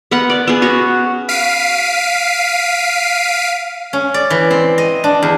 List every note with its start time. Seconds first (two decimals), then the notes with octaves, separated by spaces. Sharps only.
0.11 B3 A#4 F#5
0.30 D5
0.47 B3 G#4
0.62 C#4 F#4 C#5
1.29 F5 B6 C7 D7 D#7
3.93 C#4
4.14 D5
4.30 E3
4.50 C4
4.78 D#5
5.04 D4
5.22 E2